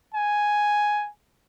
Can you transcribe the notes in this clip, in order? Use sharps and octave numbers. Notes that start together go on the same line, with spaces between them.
G#5